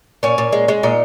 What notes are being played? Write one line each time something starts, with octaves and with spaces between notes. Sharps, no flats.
A#2 C#4
A#2
G#3
G#3
A#2 D#4